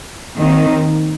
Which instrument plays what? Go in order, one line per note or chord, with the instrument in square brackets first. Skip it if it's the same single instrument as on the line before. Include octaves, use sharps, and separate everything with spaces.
[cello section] D#2 D#3 C4 D#4